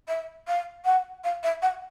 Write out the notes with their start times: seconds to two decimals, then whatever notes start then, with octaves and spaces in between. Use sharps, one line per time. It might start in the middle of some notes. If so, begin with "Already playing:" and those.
0.08 E5
0.48 F5
0.85 F#5
1.24 F5
1.43 E5
1.62 F#5